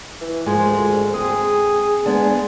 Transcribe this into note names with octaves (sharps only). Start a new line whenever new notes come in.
E3
G#2 F3 G#3 A#4
D2
C4 G#4
G#3 B3 D4